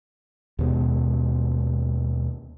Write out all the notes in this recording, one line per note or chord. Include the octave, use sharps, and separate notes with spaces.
D#2 B2 G#3